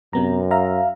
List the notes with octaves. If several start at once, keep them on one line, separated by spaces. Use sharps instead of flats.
F#2 C3 B3 A#5
E5 F5 A#5